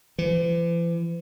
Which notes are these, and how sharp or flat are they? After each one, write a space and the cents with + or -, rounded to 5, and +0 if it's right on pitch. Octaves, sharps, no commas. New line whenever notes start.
E3 +45